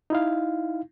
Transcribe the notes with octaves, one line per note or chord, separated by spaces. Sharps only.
D#4 E4 F5